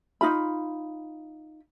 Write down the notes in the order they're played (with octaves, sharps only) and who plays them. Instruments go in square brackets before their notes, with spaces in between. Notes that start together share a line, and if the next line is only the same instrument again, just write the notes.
[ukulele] D#4 F4 B5